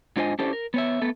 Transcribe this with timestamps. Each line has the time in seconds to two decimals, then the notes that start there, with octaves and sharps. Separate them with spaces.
0.16 G#2 D4 F4 C5 D#5 G#5
0.39 C#4 D4 E4 G4 A4 C5
0.53 A#4
0.74 B3 C#5 E5
1.02 A3 B3 A4